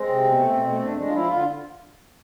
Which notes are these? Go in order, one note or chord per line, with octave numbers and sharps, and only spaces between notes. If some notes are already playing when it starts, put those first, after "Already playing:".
Already playing: G#3 C4
C3
B2
A3
B2
A3
E2 D4
G#3 D4
F4
F3 E4
D3 F4